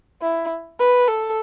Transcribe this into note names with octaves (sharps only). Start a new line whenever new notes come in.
E4
B4
A4